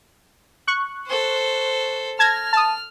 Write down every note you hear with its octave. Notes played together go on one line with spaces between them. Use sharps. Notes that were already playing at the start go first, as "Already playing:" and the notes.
C#6 F#6
A4 C5
A5 F6 G#6 A#6
A5 D#6